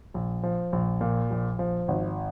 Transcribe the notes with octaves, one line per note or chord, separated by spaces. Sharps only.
A#1
F3
A#1
A#2
A#1
F3
G#1